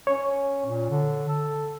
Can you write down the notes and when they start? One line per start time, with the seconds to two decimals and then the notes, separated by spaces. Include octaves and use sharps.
0.07 C#4 C#5
0.66 A#2
0.90 D3
1.28 A4